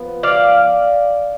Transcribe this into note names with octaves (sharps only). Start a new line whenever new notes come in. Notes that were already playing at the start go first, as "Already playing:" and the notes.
Already playing: F3 B3
D5 F5